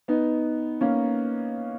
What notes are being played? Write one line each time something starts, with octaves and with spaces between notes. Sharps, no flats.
B3 D#4
A#3 C#4